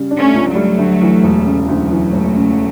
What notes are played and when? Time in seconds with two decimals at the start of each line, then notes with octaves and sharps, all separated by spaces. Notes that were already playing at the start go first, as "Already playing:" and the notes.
Already playing: C#3 G3
0.11 D4
0.18 A3 C#4
0.34 C#2
0.48 F#3 A3
0.55 G3
0.78 D2
1.01 E3
1.23 E1
1.46 C#3
1.68 D2 F#3 A3
1.91 E3
2.13 E1
2.35 C#3